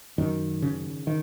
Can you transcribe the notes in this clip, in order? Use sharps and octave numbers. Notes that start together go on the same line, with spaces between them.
F#2 D#3
C#3
D#3